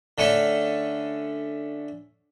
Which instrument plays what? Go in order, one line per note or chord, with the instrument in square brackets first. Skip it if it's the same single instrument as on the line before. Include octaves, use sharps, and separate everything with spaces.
[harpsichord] D3 A3 C#4 C#6